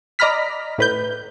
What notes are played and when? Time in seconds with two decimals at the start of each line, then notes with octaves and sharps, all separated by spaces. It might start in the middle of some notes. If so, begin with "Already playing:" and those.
0.19 D5 D#5 A#5 B5 F6 B6
0.78 A2 B4 G6